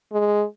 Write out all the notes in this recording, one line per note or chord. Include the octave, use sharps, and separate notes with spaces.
G#3